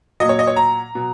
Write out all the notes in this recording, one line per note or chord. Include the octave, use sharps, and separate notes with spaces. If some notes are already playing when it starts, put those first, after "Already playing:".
A#2 F#3 D#5
C#5
D#5
C#5
A#5
B2 F#3